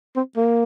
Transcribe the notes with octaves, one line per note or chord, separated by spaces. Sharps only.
C4
A#3